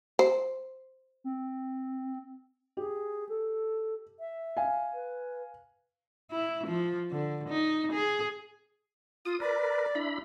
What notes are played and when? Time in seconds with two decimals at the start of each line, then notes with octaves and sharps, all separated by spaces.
0.19 C5
1.24 C4
2.77 G4 G#4
3.29 A4
4.20 E5
4.57 F5 G#5
4.94 B4
6.31 E4
6.67 F3
7.11 D3
7.49 D#4
7.93 G#4
9.25 F4 D#6
9.40 A#4 B4 D5
9.95 D4 E4 B5